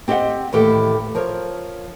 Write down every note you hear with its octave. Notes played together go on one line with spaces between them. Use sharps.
C4 G4 D#5 E5 F#5
D#2 A2 E3 G4 A4
F3 A#4 C#5